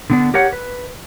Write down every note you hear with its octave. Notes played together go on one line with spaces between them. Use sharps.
D3 B3 D4
G4 A#4 C#5 F#5
B4